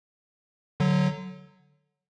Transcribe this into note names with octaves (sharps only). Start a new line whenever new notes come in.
D3 F#3